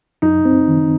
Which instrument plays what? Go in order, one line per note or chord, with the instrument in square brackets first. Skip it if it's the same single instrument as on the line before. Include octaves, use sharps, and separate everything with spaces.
[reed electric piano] F#2 [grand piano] D#4
[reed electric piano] C4
D#3